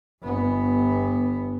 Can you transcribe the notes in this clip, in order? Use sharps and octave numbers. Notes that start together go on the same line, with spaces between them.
G1 B3